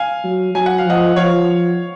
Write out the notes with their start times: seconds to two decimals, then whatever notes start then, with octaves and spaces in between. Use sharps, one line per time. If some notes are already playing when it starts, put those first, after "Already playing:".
Already playing: F5 G#5
0.24 F#3
0.55 F#3 G#5
0.66 F#5
0.78 F5
0.86 F3 D#5 F#5
1.16 F3 C#5 F5